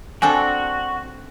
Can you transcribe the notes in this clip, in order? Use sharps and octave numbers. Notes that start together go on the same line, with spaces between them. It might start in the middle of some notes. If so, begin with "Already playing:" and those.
C4 D4 F#4 A4 G#5